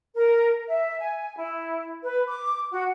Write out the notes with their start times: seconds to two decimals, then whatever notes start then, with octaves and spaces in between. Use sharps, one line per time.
0.15 A#4
0.68 E5
0.99 G#5
1.37 E4
2.03 B4
2.27 D6
2.71 F#4